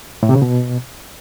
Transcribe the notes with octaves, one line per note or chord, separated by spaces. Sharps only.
A2
C3
C#3
B2